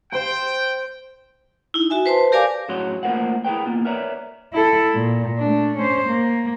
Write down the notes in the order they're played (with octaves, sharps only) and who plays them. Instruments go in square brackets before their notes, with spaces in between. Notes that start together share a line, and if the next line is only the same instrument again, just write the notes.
[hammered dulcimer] C5 C6 [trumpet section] G5
[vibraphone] D#4 E4
F#4 E5 G#5
B4 C5 A5 C6
G4 A#4 D5 F5 G#5 D6
[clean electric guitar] F#2 A2 F#4 G#4 C#5 C6
A3 A#3 F4 A#4 C5 F#5
E4 G#4 A#4 B4 G5
A#3 B3 F4
A#4 B4 C#5 D5 E5 A#5
[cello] E4 A4
A#2
A3 D4
C#4 C5
A#3